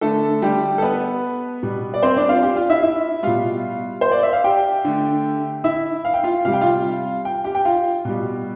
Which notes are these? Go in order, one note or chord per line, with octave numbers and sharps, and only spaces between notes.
D3 A3 A4
G3 G4
A4
B3 B4
B2 G3
D5
C4 C5
D4 D5
F4 F5
G4 G5
F4 F5
E4 E5
E4 E5
B2 G3 F4 F5
C5
D5
E5
F5
G4 G5
D3 A3
E4 E5
F5
G5
F4 F5
C3 G3 F5
G5
F4 F5
G5
G4 G5
G5
F4 F5
B2 G3